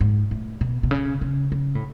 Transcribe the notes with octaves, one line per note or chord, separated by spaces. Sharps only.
G#2
A2
B2
B2
C#3
C#3
C#3
A2